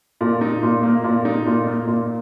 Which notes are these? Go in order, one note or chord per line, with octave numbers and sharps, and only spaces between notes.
A#2
D#4
A#2
A#3
A#2
D#4
A#2
A#3
A#2